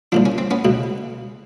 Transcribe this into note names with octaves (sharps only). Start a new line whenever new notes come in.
C2 A#2 F3 D4
C#4
C4
B3 C#4
C#2 B2